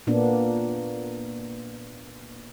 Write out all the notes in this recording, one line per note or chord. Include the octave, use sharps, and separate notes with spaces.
A#2 A#3 B3 D4